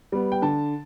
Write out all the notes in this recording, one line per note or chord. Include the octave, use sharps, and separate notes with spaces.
G3 B3
G5
D3 A5